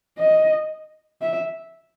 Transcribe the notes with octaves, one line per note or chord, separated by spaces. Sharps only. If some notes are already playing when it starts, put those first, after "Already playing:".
D#5
E5